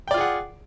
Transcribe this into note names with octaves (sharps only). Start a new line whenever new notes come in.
F4 G#4 D5 F#5 G5